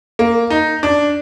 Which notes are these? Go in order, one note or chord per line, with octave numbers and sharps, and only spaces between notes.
A#3
D#4
D4